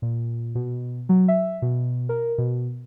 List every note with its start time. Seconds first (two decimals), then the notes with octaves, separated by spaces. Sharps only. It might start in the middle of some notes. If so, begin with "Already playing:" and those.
0.02 A#2
0.55 B2
1.09 F#3
1.28 E5
1.62 B2
2.09 A#4
2.38 B2